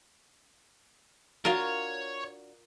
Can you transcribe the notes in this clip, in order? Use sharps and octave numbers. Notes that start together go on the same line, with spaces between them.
D4 F4 F#4 A#4 C#5